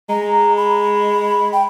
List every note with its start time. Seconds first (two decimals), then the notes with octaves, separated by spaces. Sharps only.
0.09 G#3 A#5
0.57 B5
1.53 G5